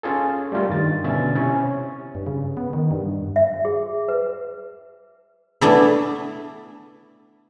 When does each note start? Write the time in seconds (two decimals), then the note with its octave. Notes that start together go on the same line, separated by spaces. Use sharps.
0.03 C#4 F4 G#4 A4
0.52 G3 A3 F4 A#4
0.69 G2 D#3 A6
1.04 B2 D3 C#4 E5 A6
1.35 C3 C#4 E4
2.15 G2
2.27 C#3
2.57 B3
2.73 D#3
2.91 G2
3.36 E5
3.65 G#4
4.08 B4
5.61 A3 B3 D4 E4